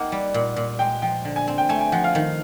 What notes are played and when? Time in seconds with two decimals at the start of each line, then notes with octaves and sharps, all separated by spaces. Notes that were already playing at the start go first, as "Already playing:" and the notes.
Already playing: A#3 D#4 F#5 G5
0.12 G3
0.34 A#2
0.56 A#2
0.79 G#3 G5
1.02 F3 G5
1.25 D3
1.36 G#5
1.48 C4 G#5
1.58 G5
1.69 A3 G#5
1.81 G#5
1.92 F3 F#5
2.04 F5
2.15 D#3